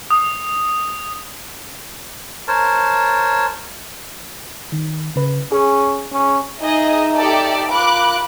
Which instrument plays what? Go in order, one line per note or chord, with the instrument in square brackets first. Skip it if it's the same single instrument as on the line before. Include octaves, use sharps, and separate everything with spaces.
[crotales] D#6
[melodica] A#4 C5 C#5 A5
[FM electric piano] D#3
C#3 B4
[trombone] C#4 [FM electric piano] G#4
[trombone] C#4
[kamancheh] D#4 E5 [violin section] G#4 D#5
[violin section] G4 A4 D5
[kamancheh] F4 B5 [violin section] A#4 D6 F#6